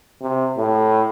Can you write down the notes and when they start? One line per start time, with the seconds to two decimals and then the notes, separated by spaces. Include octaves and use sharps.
0.21 C3
0.58 A2